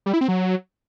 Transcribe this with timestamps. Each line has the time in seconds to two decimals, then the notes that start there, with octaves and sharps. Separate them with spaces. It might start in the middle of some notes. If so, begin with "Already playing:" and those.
0.06 G3
0.13 E4
0.21 C4
0.28 F#3